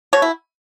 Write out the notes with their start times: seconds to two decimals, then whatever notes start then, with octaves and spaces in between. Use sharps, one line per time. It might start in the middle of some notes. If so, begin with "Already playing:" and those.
0.13 B2 C#5
0.22 E4